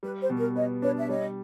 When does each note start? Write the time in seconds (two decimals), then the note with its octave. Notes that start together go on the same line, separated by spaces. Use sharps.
0.03 G3 B4
0.21 C5
0.30 B2
0.38 A#4
0.56 B3 C#5 D#5
0.82 D4 B4 C#5
0.98 E5
1.08 G3 C#5 D#5